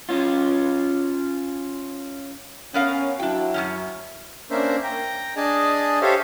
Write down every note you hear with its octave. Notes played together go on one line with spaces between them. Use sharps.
C#4 F4
B3 C#4 A#4 F5
F#3 D4 E4 F#4 G5
F#2 B2 C#4
A#3 C#4 D4 A#4 C5 E5
G5 A#5
D4 G#4 D#5 G#5 A5
G4 A4 C5 C#5 E5 F5